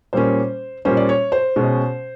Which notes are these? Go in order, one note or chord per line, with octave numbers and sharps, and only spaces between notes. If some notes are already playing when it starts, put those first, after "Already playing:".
A#2 G3 A#3 C#4 C5
A#2 G3 A#3 C#4 C5
D5
C#5
C5
B2 G#3 C#4